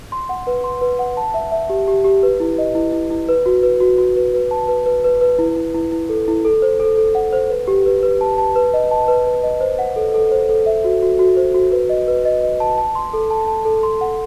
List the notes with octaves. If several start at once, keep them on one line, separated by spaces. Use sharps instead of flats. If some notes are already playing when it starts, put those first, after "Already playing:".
C6
F#5
B4
C6
B4
F#5
A5
E5
E5
G4
G4
G4
B4
E4
D#5
E4
E4
E4
B4
F#4
B4
F#4
F#4
B4
B4
A5
B4
B4
B4
B4
E4
E4
E4
E4
A4
E4
A4
C5
A4
A4
F#5
C5
B4
G4
B4
B4
A5
A5
B4
D#5
A5
B4
B4
D#5
C5
F#5
A4
A4
C5
A4
E5
F#4
F#4
F#4
C5
F#4
B4
D#5
B4
D#5
D#5
A5
A5
C6
A4
A5
A5
A4
C6
F#5